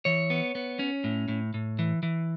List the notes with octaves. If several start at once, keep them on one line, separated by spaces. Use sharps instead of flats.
E3 C#5
B3
B3
C#4
A2
A2
A2
E3
E3